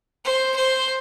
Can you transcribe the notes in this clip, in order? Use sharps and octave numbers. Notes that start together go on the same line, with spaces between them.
C5
C5